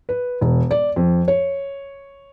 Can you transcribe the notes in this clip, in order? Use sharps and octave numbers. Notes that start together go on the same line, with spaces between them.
B4
E1
D5
F2
C#5